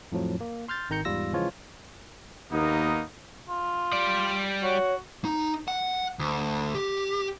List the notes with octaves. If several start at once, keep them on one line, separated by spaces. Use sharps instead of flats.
F2 A2 F3 F#3
A#3
C6 F6 G6 A6
G#1 D#3 A#5 G6 C#7
E2 G#2 G3 F4 E6 A#6
C#3 E3 F3 G#3 F4 C#5
D#2 A#3 B3 D#4
F4
G3 D5
F#4 C#5
D#4
F#5
D2
G4